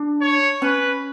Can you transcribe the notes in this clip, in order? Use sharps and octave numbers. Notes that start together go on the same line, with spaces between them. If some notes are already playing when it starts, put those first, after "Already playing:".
Already playing: D4
C#5
C#4 B4